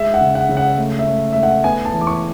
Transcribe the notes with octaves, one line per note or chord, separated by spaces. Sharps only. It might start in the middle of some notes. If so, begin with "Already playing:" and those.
Already playing: G#3 E5
F#5
C#3
F#5
C#3
F#5
A3
E5
A3
A3 E5
F#5
B3 G#5
A5
E3
D6
C#6